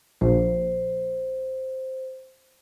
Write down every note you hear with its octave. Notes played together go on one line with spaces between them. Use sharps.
A#1 C5